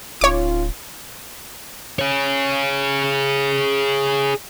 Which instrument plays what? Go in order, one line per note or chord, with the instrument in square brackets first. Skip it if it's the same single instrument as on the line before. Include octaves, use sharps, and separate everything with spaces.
[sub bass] D1 [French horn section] C#4 D#4 F4 [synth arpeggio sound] C#5 D6
[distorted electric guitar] G#4 C#5